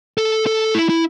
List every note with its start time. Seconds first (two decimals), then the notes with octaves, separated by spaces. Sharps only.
0.18 A4
0.47 A4
0.75 E4
0.89 E4